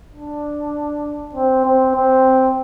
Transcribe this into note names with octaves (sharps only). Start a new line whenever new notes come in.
D4
C4
C4
C4